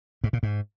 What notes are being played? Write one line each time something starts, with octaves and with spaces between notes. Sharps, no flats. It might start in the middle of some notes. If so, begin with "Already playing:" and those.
G#2
A#2
G#2